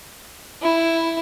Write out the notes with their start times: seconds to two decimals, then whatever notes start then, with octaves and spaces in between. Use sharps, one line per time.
0.62 E4